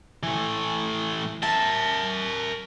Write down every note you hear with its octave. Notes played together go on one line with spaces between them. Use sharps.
E3 A3
A#4 E5 A5